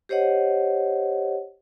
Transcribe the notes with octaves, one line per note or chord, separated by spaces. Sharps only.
G4 C5 C#5 D#5 F#5